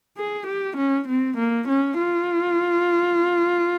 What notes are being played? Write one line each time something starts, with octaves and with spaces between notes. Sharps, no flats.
G#4
G4
C#4
C4
A#3
C#4
F4